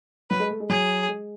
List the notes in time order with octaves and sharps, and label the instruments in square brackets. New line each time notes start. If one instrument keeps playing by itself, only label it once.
[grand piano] F#3 [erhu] B4
[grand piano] G#3
A3
G#3
[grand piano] F#3 [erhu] G#4
[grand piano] G#3